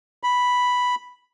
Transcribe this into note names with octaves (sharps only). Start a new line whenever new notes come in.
B5